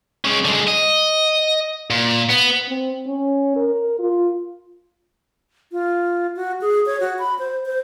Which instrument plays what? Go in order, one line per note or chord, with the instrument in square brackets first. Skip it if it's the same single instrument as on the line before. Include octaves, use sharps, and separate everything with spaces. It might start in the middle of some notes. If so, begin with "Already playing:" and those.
[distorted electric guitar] G#3 C#4
D3 G#3
D#5
A#2
B3
[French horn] C4
C#4
A#4
F4
[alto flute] F4
F#4
G#4
C#5
F#4
B5
C5
C5